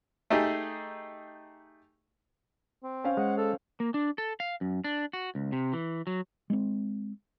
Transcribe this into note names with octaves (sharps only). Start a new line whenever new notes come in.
A3 D#4 G4 G#4
C4
C#4 C5 F5
G#3 F#5
A4
A#3
D4
A4
F5
F#2
D4
F#4
C#2
C3
E3
F#3
G#3 B3 C4